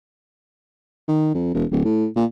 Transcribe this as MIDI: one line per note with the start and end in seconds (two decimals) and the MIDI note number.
1.08 1.30 51
1.34 1.51 41
1.54 1.65 28
1.71 1.85 26
1.85 2.07 45
2.16 2.25 46